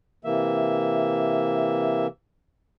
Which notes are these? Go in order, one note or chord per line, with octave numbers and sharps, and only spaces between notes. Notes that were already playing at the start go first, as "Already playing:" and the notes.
C3 E3 A#3 E5